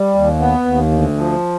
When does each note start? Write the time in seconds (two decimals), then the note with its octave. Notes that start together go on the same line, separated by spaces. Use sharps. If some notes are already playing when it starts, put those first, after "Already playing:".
Already playing: G3
0.15 D#2
0.40 B3
0.65 D#2
0.92 D2
1.17 F3